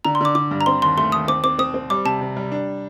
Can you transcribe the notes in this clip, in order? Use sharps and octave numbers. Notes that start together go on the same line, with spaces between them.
D3 A#5
C6
D3 D6
D3 D6
G2
A#5
C4 C6
D#2 C6
A3 C6
D#2 D#6
C4 D6
C4 D6
C4 D#6
C4
G3 D6
C3 A5
C3
G3
D4